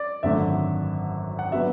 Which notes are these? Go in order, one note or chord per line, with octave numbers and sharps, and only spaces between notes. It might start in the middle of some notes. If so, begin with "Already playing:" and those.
Already playing: D5
G#1 F#2 D3 A3 D4 E5
F#5
F#3 B3 D4 E5